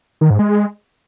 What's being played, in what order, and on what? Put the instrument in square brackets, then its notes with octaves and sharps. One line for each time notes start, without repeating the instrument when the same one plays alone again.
[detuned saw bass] D#3
G#2
G#3